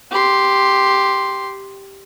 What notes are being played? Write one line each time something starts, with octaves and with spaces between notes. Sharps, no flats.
G4 C6